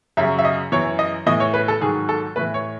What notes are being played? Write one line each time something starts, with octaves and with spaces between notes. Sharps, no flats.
F#2 C#3 F#3 E5
E5
D#5
F#2 E3 C#5
D#5
A2 E3 D#5
C#5
B4
A4
G#2 D#3 F#3 G#4
A4
A2 E3 B4
C#5